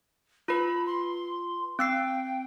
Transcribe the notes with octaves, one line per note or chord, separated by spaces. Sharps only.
F4 B4 B5
C6
C4 G5 E6 C7